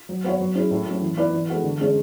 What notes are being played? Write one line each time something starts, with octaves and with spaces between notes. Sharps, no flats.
F#3
B3 F#4 C#5
F#3
C#4 E4 G#4
A2
F#3 C#4
E3
B3 E4 B4 D5
E3
G#3 B3 F#4 A4
D3
G#3 C#4 G#4 C#5